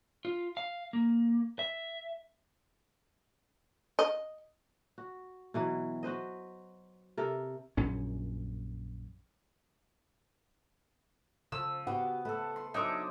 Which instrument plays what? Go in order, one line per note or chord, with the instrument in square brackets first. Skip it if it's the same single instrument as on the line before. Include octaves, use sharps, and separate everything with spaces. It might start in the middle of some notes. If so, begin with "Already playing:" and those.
[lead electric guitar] F4
F5
A#3
E5
[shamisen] D#5
[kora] F#4
B2 E3 F#3
F#4 B4 C5 D#5
C3 A4 A#4
[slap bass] A#1 F#2 C#4
[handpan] C#3 [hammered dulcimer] F3 [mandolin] E6
[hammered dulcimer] B3 [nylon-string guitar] F#4 G4 [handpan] F#5
[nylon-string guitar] A3 [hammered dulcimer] A4 B4
[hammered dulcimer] C6
[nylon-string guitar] F#3 [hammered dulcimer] D4 G#4 C5 [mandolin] D#4 E5 D6